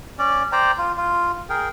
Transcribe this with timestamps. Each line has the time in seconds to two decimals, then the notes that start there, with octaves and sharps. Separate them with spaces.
0.19 C#4 D5
0.52 C5 D5 G5 A#5
0.78 F4
0.97 F4
1.50 G#4 A#4 G5